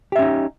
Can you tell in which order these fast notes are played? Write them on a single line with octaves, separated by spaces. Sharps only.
G4 E5 C#4 D#4